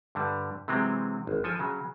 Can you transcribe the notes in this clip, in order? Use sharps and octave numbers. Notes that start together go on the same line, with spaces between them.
G2 D3 G3
C3 E3 F#3 G#3 C4
G#1
F3 A4 G#5
C#3 F#3